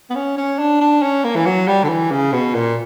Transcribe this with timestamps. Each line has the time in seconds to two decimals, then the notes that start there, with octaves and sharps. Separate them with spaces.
0.10 B3
0.15 C#4
0.38 C#4
0.59 D4
0.81 D4
1.02 C#4
1.24 A#3
1.36 E3
1.46 F#3
1.68 G3
1.84 D3
1.89 E3
2.11 C#3
2.33 B2
2.54 A#2